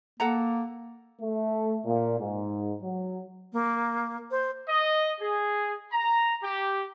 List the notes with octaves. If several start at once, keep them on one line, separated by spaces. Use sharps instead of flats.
A#3 A4 F#5 A#5
A3
A#2
G#2
F#3
A#3
C5
D#5
G#4
A#5
G4